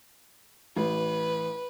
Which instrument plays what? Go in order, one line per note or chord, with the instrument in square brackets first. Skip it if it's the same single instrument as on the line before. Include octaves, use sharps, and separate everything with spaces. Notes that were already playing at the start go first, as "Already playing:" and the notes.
[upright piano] A1 [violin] B4